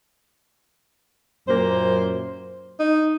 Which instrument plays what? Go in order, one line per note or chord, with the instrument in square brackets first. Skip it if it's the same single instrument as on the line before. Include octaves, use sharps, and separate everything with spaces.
[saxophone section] F#2 A#2 A#3 C5
[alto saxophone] D#4